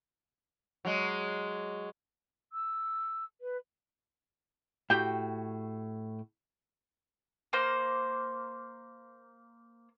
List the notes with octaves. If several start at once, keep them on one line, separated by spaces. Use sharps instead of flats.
F#3 G#3
E6
B4
A2 F#4 G4 G5
A#3 C5